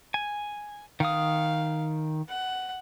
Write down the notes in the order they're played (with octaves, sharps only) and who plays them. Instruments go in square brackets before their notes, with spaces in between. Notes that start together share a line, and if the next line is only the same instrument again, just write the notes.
[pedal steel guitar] G#5
[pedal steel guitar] D#3 D#6 [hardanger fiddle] F5
[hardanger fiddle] F#5